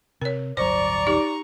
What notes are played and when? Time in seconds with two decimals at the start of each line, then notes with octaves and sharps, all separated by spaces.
0.21 C3 A#4 C#5
0.57 D1 G1 F#3 C5 D5 A#5 C#6
1.07 D#4 G4